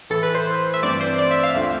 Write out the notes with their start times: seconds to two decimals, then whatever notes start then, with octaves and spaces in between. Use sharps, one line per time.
0.10 A2 E3 A3 E4 A4
0.23 B4
0.35 C5
0.74 E5
0.82 G2 E3 A3 C4 D5
1.01 C5
1.19 D5
1.31 E5
1.43 F5
1.55 D2 D3 A3 C4 F4